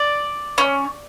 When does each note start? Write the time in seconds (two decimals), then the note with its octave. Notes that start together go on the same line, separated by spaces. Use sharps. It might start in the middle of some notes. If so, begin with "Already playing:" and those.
Already playing: D5
0.58 C#4